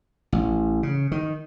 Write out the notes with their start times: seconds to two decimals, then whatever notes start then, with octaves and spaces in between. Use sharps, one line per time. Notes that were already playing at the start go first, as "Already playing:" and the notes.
0.32 A1
0.83 C#3
1.12 D#3